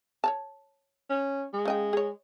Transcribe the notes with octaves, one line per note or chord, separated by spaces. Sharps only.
C#5 D5 A5
C#4
G#3
C#3 D#5 G5
G#4 C#5